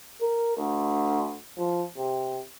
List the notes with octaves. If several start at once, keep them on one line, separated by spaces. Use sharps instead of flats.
A#4
D2
F3
C3